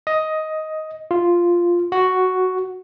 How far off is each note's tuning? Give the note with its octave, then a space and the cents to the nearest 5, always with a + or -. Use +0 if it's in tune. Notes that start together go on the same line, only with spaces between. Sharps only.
D#5 +10
F4 -5
F#4 +5